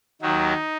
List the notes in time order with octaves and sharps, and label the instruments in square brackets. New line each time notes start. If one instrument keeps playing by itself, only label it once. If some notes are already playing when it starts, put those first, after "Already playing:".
[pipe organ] D#2 D#3 F#3 D#4